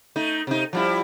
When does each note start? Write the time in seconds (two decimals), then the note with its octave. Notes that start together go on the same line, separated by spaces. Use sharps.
0.16 A3 D#4
0.47 C3 D#4
0.73 F3 G3 E4